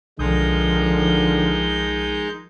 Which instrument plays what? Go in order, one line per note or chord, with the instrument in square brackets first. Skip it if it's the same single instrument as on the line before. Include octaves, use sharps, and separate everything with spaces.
[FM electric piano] B1 D#6 [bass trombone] D3 [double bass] D#3 F3 [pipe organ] G#3 D#4 G6